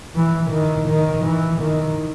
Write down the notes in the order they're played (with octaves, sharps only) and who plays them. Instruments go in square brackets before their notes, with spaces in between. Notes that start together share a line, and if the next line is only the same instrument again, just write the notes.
[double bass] E3
D#3
D#3
E3
D#3